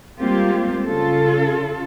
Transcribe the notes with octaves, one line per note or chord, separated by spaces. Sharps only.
G3 G#3 A#3 C4 F4 G4
C#3 F4 A4